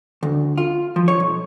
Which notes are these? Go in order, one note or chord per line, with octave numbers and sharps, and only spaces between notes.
D2
F4
F3
C#5
B1